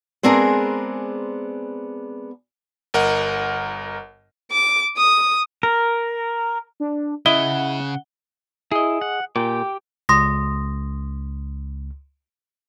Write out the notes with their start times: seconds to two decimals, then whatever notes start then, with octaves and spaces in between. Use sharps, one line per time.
0.23 G#3 B3 C4 D4 G#4 A#4
2.94 G1 A#4 D#5 F#5
4.51 D6
4.97 D#6
5.63 A#4
6.80 D4
7.26 C#3 E4 D#5 F#5 G7
8.72 E4 G#4 D#5
9.01 F#5
9.36 A#2 G4 G5 D6
10.09 C#2 C6 D#6 A#6